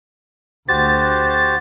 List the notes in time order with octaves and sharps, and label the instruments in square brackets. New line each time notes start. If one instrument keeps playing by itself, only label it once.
[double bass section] D2 [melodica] F#4 G4 C5 [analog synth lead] A6